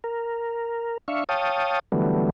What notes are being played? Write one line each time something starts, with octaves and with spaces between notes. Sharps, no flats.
A#4
D4 E5 F5 C#6
C#5 F5 G5 A5 D#6
D3 E3 F#3 G3 A3 B3